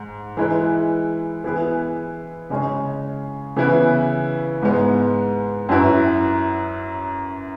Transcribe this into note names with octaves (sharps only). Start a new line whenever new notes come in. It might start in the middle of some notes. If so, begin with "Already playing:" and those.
Already playing: G#2
E3 G#3 E4 B4
E3 B3 E4 G#4 B4
C#3 G#3 C#4 G#4
C#3 E3 B3 E4 B4
G#2 G#3 B3
F#2 F#3 E4 B4